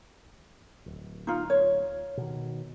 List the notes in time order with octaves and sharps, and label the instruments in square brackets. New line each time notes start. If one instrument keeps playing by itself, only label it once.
[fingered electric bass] D1
[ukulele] D#4 F4
C#5
[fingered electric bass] B2 D#3